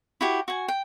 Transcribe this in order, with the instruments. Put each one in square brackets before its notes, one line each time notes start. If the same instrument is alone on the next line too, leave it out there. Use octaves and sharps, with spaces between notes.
[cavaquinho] E4 F#4 G4
F#4 G#5
G5